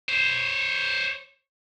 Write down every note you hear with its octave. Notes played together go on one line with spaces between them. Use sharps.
C5 C#5